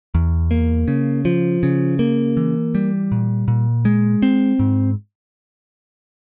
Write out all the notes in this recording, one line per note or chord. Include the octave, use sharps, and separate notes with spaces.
E2
A#3
C#3
F3
C#3
A#3
E3
G3
A#2
A#2
G#3
C4
G#2